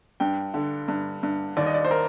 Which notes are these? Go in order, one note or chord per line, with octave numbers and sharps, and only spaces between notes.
G2 G5
D3
G2
G2
D#2 D5
D#5
D5
C5
A#4